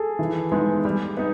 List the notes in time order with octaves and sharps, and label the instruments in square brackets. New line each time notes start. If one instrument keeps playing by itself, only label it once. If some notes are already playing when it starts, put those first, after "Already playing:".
Already playing: [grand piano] G#4 A4
[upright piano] E3
G#3 B3 D#4
G3
B3 D#4